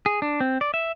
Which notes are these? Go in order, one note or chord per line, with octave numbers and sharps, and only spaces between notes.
G#4
D4
C4
D5
E5